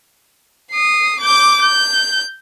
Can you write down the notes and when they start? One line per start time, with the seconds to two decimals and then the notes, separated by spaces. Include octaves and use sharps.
0.71 D#6 C7
1.21 D6 G6
1.62 G6